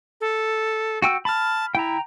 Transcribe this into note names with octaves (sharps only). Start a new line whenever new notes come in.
A4
F#4 G5 E6
A5 B5 F6
E4 G5 A#5